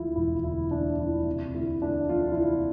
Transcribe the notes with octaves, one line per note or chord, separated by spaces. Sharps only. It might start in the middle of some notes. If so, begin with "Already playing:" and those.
Already playing: D2 F3 E4 F4
E1 E4
D3 E4
D2 D4
F3 E4
C3
D2 E4
D2 D4
F3 F4
E4
C3 F4